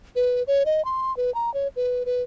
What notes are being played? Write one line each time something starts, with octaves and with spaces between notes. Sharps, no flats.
B4
C#5
D#5
C6
B4
A#5
C#5
B4
B4